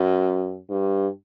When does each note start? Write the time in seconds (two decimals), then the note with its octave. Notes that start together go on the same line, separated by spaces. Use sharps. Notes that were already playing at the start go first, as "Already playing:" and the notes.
Already playing: F#2
0.70 G2